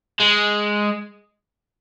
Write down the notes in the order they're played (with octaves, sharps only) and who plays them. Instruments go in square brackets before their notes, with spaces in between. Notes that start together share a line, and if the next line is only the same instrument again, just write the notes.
[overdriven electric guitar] G#3